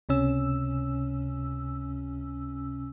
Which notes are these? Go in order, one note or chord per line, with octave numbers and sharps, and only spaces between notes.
C#2 C3 C#4 E6